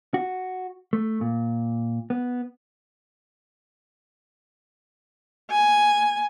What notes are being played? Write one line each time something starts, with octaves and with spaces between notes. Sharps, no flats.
F#4
A3
A#2
B3
G#5